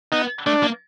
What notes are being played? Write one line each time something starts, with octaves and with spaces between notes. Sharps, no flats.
B3 D#4
A3 D4
A#3